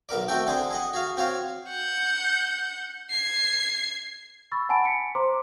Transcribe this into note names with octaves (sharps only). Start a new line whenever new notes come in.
B1 B3 A#4 D5
A3 C4 F#4 A4 G5
D3 C4 D4 G#4
G#4 D#5 F#5
F#4 G#4 F5
C4 F#4 C#5 F5
F#5 G6
G#6 C7
B5 C#6 E6 A6
F#5 G#5 A5 B5 D7
B6 C#7 D7
C5 A#5 C6 D6